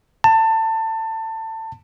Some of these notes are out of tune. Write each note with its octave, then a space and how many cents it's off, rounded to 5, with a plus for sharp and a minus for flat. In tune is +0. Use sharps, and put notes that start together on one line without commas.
A5 +25